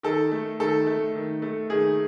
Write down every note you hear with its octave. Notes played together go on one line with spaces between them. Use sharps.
D#3 A4
A3
D#3 A4
A3
D#3
A3
D#3 G#4